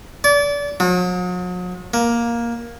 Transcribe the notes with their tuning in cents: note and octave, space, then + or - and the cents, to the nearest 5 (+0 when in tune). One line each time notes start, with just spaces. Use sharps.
D5 -30
F#3 -45
A#3 +10